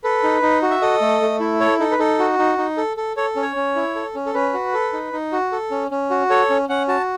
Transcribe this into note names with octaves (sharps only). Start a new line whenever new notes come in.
A4 B4
D#4
D#4
F#4
E5
A4 D#5
A3
A3
E4
A4 C#5
D#4 A4
B4
D#4 A4
F#4
D#4
D#4
A4
A4
A4 C#5
C#4
C#5
C#4
E4
A4
C#4
A4
C#4 B4
F#4
A4
D#4
D#4
F#4
A4
C#4
C#4
F#4
A4 C#5
C#4
C#4 F#5
F#4 A5